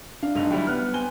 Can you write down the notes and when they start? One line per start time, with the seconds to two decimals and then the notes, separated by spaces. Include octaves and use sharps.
0.23 D4 F5
0.35 B1 G2 D3 D#4 F7
0.50 F#3 G3 E4 G5
0.67 B3 F6 F#6
0.93 C4 G#5 G7